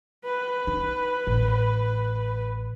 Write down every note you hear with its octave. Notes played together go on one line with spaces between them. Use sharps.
B4
D#4
A1